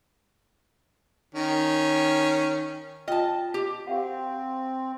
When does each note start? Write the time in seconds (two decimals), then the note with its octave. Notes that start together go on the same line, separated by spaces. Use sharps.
1.35 D#3 C#4
3.08 F4 D#5 G5 A5
3.54 G4
3.87 C4 G4 F5 F#5